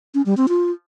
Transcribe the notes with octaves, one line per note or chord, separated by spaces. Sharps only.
C#4
G3
C4
F4